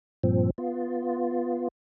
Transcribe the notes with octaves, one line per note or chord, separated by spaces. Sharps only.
G2 A#2 F3 C4
B3 F4